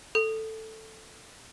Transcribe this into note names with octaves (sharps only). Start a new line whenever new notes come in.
A4